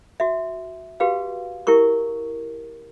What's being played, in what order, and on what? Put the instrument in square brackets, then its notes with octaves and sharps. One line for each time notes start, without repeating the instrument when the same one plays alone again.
[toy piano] F#4 E5
F#4 G4 B4 F5
E4 G4 A#4 C#6